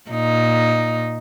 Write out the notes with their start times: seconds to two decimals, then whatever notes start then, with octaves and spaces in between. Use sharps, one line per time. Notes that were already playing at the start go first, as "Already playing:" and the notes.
0.10 A#2 D#4